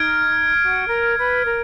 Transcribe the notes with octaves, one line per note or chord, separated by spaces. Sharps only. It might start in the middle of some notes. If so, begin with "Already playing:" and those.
Already playing: D#4 F6 G#6 D7
F#4
A#4
B4
A#4